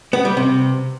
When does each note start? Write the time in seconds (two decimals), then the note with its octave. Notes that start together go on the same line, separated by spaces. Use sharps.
0.13 B3
0.25 G3
0.37 C3